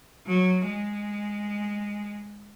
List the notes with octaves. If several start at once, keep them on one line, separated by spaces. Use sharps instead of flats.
F#3
G#3